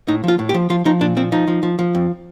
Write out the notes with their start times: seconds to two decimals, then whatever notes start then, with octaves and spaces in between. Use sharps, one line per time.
0.08 A2 D#4
0.24 F3 F4
0.39 A2
0.49 G4
0.54 F3
0.70 F3 F4
0.85 F3 D#4
1.01 A#2 D4
1.17 F3 C4
1.32 F3 D#4
1.48 F3
1.63 F3
1.79 F3
1.95 F2